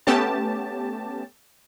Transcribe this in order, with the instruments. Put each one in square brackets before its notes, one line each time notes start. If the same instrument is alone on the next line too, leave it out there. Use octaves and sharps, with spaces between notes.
[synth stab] A3 B3 C#4 G4 A5